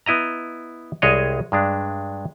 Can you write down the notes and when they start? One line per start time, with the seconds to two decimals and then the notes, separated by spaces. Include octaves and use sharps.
0.06 B3 E4 D#5 A#5
1.02 C2 G#3 G#4 C#5 D#5
1.52 G2 G#3 D4